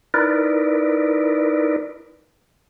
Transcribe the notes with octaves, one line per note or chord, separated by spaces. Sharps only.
D#4 E4 A#4 B4 D5